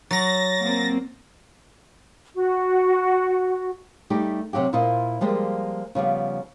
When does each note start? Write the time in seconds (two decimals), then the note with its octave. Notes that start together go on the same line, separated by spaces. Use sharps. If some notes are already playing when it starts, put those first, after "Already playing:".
0.11 F#3 A6 A#6
0.60 A#3 C4
2.34 F#4
4.10 G3 A3 D#4 G4
4.53 C3 F#3 F#4 G4
4.73 A#2 E4 F4 C5 D#5
5.21 F3 G3 G#3 A#3
5.95 C#3 F3 G3 B3